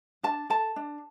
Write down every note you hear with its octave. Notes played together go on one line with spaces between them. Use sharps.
D4 A5
A4 A5
D4